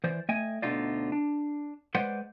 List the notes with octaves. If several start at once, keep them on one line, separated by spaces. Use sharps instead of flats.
E3 C5 D5
A3 D#5 G5 G#5
D2 B2 D3 D#4 F4 D5
D4
G#3 B4 C5 D5 F#5 C6